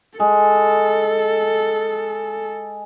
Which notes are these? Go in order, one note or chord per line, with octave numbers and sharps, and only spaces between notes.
G#3 A4